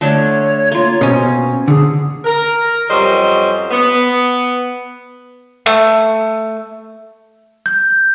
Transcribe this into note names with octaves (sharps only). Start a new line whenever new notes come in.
D3 A3 D4 C#5
A#3 F4
B2 C4 C#4
D3 G#4
A#4
F2 F#3 G3 C#4 C5 D#5
B3
A3
G6